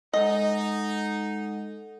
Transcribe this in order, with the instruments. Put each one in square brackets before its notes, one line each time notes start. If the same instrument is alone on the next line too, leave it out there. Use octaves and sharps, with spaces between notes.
[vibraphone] G#3 A4 F#5 [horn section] D#4 [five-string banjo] D#5